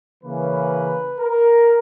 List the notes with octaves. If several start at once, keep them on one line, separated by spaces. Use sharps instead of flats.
C#3 E3 A#3 C#4 B4
A#4